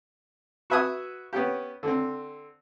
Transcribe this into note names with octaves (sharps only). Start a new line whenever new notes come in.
F#4 B4 E5 G#5 D#6
B3 C#4 G4
D3 C4